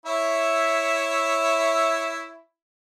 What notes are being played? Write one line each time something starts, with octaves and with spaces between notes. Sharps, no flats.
E4 C#5 E5